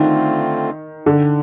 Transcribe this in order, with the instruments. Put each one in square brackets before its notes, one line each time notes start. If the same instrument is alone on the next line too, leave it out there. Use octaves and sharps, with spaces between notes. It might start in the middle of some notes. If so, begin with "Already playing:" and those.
Already playing: [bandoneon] D3 A3 C4 F4 [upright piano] D#3
[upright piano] D3